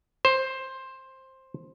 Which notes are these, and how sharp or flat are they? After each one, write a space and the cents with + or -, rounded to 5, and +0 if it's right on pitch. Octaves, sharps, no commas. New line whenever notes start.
C5 +10